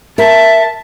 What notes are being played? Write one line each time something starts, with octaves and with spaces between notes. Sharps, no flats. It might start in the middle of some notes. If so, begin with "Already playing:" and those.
A#4 E5 A5